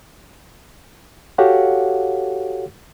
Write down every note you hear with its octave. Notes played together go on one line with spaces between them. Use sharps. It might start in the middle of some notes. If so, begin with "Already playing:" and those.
F#4 G4 A4 C#5 F5 F#5